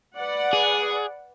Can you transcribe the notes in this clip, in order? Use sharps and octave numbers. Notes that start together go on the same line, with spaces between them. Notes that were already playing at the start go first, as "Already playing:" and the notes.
B4 D5 F#5
G#4